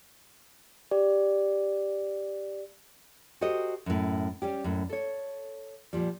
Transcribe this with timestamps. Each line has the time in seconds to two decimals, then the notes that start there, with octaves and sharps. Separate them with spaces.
0.91 G4 D5
3.41 F#4 G4 A4 C5 D#5
3.86 F#2 A2
4.42 G3 C#4 G4
4.64 F#2 A2
4.89 A4 C#5
5.93 A#2 F3 G3